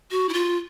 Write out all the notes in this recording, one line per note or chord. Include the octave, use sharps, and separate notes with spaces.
F#4
E4
F4